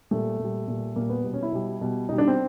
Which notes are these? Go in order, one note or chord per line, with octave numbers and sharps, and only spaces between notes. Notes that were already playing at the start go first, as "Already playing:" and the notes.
A#2 G3 A3
A#2
G3
A#2 G3
A#2 G3 A#3
B3
B2 G3
C#4
E4
B2 G3
B2 G3
B2 G3 D#4
D4
C4